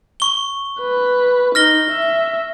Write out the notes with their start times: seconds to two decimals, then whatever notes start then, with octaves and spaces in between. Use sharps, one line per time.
0.20 C#6 G7
0.80 B4
1.55 D#4 F6 A#6 G7
1.91 E5